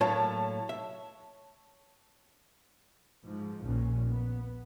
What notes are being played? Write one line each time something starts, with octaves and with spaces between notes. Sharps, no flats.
A2 F#3 A#3 C#5 A5
E5
G#2 F3
A#1 D#2 A#2 C#4
B3